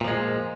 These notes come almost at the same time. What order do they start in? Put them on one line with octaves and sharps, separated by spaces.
A#2 F3 G#3